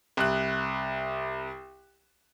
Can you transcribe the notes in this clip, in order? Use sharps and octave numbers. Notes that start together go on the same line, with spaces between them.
C2 F#6